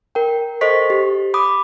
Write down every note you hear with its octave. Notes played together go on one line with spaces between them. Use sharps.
A#4 G5
A4 C5 D#5 C#6 B6
G4
B5 D6 D#6